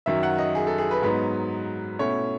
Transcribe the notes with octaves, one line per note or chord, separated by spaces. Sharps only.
F#2 D#3 F#3 E5
F#5
D#5
G#4
A4
G#4
B4
G#2 F#3 B3 D#4 B4
B2 A3 C#4 E4 C#5